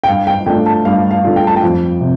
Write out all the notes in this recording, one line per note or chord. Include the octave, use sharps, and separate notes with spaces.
G5
G2 F5
G5
D3 A3 D4 F4 G5
A5
G2 F5
F5
D3 A3 D4 F4
G5
A5
G5
F2
C3